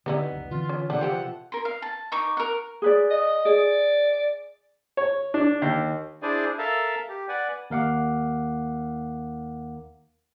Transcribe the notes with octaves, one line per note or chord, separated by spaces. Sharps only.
D3 G3 B3 C4 D#4 E4
F#1 C#2
D3 E3 C4 F4
C#4
C3 F3 D4 A4 F#5
F4 G4 C5
A#4 C6
F5
A5
D#4 C#6 D6
A#4 F#5
G#4 B4 D5
D#5
G#4 D5
C#5
D4
D#2
D4 E4 G#4 C5 D5 G#5
A4 A#4 E5 F5 A5 A#5
G4
B4 D5 F#5 G#5
D#2 A#4 F5 F#5 D6